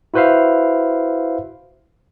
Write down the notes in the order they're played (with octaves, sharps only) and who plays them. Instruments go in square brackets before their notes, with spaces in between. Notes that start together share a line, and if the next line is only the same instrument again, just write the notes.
[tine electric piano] E4 F#4 B4 C5 E5 F5